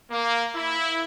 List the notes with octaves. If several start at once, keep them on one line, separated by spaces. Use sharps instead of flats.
A#3
E4